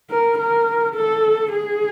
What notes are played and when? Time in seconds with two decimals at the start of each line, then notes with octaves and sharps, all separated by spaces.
0.10 A#4
0.38 A#4
0.95 A4
1.52 G#4